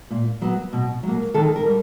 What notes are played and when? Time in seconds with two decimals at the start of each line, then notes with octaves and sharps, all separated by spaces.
0.10 A#2
0.42 F#3 B3
0.73 B2
1.03 F#3 A#3
1.34 D#3 A4
1.56 A#4
1.66 G3